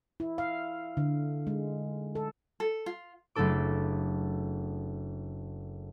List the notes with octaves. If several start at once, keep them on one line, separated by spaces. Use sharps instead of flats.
E4
F5
D3
G#3
A4
A4
F4
F#1 A3 D4 A4 D6